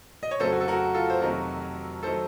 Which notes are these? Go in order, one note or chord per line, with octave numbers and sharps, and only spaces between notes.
D#5
C#5
F2 C#3 F#3 A3 A4 C5
F#4
A4
F#4 A#4
F4 A4
C5
F2 C3 D#3 F#3 A3 F#4 A#4
D#3 F#3 A3 A4 C5